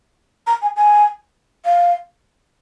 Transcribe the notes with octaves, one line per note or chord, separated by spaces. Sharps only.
A#5
G#5
G#5
F5